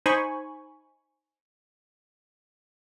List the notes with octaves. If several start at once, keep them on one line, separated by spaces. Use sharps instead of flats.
D#4 C5 G#5 B5 C#6